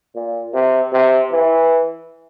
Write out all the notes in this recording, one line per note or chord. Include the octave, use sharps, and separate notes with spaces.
A#2
C3
C3
E3